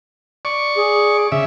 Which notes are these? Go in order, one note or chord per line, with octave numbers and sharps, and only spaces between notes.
D5 C#6
G#4
C#3 E5